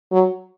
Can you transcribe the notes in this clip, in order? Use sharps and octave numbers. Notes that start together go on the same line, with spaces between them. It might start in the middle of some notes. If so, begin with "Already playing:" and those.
F#3